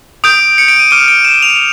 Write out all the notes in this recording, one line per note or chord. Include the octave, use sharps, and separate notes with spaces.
D#6 G6 D7
C#7
D7
D#7
D6 F6 D#7
D7
E7
F7